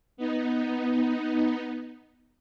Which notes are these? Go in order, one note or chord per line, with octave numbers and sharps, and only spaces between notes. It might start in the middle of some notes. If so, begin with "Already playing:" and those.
B3 D#4